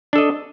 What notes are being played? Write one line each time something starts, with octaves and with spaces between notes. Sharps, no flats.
D4 A4 D#5